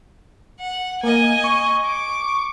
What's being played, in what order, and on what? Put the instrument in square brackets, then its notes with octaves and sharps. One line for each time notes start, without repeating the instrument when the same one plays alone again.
[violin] F#5
[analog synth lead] A#3 [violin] D#5 G#5
[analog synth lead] C#6
[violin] D6